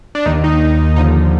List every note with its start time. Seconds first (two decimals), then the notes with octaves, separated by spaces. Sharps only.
0.15 D4
0.26 D#2 D#3 D#4
0.44 D#4
0.61 D#4
0.95 D#2 D3 F3 D#4